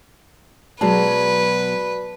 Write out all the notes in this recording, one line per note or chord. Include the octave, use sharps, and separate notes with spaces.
B2 F#3 G#3 F#4 B4 D5 A5